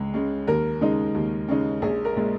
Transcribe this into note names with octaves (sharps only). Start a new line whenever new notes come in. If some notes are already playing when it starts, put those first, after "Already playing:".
Already playing: C#2 G#3
C#3 G#3
D#2 A#4
C#3 G#3 D#4
D#2
C#3 G#3 D#4
A#1 G#4
A#4
A#2 G#3